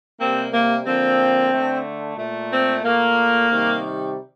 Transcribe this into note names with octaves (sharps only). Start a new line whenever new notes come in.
C3 G3 A#3 C4
A#3
D3 F3 A#3 C4
D3 A3
A#2 A3
C4
A#2 A3 A#3
C3 D#3 G3